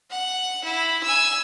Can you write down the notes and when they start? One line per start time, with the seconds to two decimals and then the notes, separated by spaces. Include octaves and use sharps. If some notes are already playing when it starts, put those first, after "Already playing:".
0.10 F#5
0.64 E4
1.03 G#5 E6